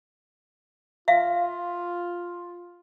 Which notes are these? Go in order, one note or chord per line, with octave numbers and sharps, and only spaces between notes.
F4 E5 F5